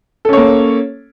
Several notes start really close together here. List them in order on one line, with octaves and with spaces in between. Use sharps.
A4 C#4 C#5 A#3